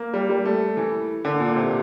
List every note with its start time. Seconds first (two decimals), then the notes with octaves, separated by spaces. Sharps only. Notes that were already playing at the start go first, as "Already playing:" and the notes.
Already playing: A#3
0.14 G3
0.30 G3
0.45 A3
0.77 E3
1.25 D3
1.40 A#2
1.56 C3